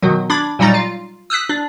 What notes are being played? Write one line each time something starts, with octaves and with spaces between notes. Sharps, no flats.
B2 D#3 F#3
D4 B5 D6 G#6
A#2 F#3 G3 D#4 A#5 A6
F4
D#6 E6 F#6 B6
D4